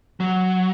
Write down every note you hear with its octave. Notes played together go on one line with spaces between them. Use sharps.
F#3